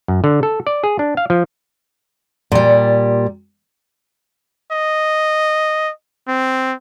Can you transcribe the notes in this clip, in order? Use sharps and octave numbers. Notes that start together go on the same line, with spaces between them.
F#2
D3
A4
D5
G#4
D4
F5
F3
A#2 G3
D#5
C4